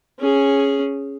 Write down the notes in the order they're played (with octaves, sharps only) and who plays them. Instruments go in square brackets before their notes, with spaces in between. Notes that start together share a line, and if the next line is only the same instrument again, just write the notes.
[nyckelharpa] C#4 G#4